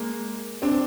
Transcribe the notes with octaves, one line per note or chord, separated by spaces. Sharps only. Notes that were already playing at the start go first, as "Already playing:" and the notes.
Already playing: G#3 A#3
C4 D4